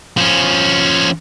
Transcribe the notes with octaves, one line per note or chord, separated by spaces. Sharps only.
F3 C#4